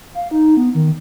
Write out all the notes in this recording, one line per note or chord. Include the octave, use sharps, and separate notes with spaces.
F5
D#4
B3
D#3